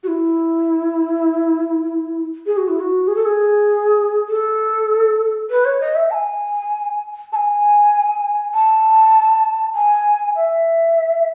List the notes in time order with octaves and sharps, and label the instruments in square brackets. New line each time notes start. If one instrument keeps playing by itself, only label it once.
[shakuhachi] F#4
E4
G#4
F#4
E4
F#4
G#4
A4
G#4
A4
B4
C#5
D#5
E5
A5
G#5
A5
G#5
A5
G#5
E5